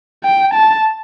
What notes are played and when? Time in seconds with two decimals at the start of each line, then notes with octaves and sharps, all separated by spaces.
0.24 G5
0.54 A5